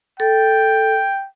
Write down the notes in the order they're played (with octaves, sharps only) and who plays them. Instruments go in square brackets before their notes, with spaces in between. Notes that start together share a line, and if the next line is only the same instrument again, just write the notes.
[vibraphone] A4 [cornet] G5